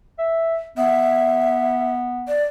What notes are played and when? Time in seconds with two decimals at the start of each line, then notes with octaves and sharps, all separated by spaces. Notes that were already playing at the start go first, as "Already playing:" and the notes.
0.18 E5
0.77 B3 E5
2.28 D5